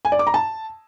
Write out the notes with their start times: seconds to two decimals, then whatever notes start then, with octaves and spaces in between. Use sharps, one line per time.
0.05 G#5
0.12 D5
0.19 D6
0.27 A#5
0.34 A5